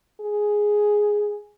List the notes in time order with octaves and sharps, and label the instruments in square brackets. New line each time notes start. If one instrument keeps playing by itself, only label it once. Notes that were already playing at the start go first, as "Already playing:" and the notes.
[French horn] G#4